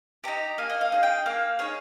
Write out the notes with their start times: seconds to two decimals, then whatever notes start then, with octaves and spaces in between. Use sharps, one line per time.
0.24 D#4 G4 A#5
0.58 A#3 G#5
0.70 D#5
0.81 F5
0.92 D#4 G#4
1.03 G5
1.26 A#3 F5
1.59 D#4 G#4 C#5